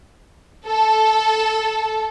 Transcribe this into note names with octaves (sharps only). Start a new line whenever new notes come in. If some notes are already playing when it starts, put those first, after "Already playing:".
A4